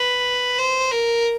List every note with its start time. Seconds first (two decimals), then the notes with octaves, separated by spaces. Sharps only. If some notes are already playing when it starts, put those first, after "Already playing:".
Already playing: B4
0.59 C5
0.91 A#4